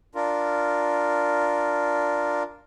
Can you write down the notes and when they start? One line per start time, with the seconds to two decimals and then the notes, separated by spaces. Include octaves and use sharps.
0.15 D4 F4 A#4